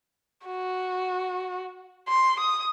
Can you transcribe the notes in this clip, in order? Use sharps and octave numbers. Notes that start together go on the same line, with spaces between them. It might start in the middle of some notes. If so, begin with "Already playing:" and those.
F#4
C6
D#6